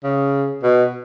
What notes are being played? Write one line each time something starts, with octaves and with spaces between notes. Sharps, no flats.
C#3
B2